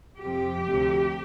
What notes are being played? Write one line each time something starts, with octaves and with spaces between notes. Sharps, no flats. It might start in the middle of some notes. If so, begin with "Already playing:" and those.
F2 C3 F3 G4
D2 C3 F3